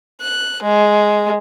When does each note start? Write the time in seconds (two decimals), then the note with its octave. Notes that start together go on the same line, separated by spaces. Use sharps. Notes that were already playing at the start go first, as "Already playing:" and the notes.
0.21 F#6
0.63 G#3